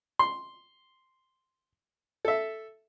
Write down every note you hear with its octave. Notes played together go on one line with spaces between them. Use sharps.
C6
A4 E5